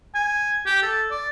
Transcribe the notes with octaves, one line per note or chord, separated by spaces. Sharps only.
G#5
G4
A4
D5